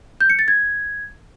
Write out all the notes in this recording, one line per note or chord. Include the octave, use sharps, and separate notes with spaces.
G6
C#7
A6
G#6